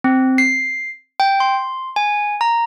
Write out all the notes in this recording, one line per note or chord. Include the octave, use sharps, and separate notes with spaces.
C4
C7
G5
C6
G#5
A#5